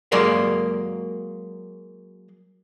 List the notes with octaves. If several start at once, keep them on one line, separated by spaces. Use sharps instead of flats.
F#3 G#3 A#3 A#4 D5 F5